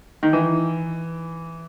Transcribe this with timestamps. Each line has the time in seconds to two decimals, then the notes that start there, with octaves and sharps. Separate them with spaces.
0.23 D#3
0.33 E3